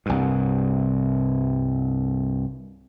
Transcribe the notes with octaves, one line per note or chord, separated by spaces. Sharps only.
C2 G2